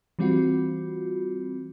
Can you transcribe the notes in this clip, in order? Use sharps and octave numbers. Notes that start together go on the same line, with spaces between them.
E3 G3 C4 F4 F#4